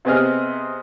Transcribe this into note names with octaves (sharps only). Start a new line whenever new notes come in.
C3 B3 C4 G#4 D#5 F6